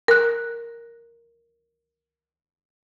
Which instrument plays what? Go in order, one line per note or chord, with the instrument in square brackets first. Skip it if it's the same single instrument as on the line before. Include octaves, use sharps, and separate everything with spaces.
[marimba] A#4 F#6